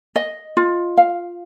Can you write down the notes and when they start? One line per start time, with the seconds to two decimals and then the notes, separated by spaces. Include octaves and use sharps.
0.16 D#5
0.57 F4
0.97 F5